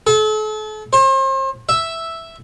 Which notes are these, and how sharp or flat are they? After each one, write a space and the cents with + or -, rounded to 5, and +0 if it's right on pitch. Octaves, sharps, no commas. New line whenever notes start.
A4 -40
C5 +40
E5 +0